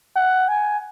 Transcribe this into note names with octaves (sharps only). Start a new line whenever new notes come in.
F#5
G#5